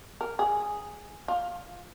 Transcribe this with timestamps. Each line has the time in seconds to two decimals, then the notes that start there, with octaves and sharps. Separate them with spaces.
0.21 A#4
0.39 G#4
1.28 F4